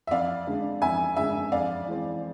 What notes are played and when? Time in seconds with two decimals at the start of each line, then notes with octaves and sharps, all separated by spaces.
0.07 E5
0.11 F2 D5 F5
0.47 D3 G#3 D4
0.82 F2 E5 G#5
1.17 D3 G#3 D4 E5 G#5
1.52 F2 D5 F5
1.87 E3 G#3 C4